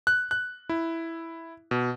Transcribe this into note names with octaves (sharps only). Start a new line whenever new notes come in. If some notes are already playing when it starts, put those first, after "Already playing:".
F#6
F#6
E4
B2